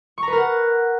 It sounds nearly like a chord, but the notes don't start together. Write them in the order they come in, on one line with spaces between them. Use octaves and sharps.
C#6 A#5 B4 A#4 F#5